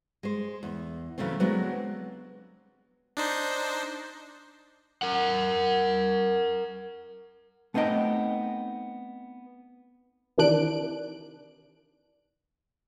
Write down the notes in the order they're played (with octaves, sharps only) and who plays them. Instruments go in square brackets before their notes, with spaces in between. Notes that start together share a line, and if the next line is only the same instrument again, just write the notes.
[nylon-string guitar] G#3 C5
E2
C#3 E3 F#3 A3 C4
F#3 G#3 B3 C4 D4 F#4
[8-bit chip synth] D4 D#4 C5
[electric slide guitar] A#4 F#5
[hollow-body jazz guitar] A3 B3 C4 D#4 D#5 G5
[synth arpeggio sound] C3 D#3 E3 D4 F#6 D7